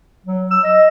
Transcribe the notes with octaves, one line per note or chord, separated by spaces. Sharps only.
F#3
E6
D#5